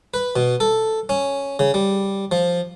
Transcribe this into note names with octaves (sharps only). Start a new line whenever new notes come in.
B4
B2
A4
C#4
C#3
G3
F3